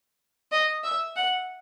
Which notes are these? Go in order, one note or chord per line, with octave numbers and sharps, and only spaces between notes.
D#5
E5
F#5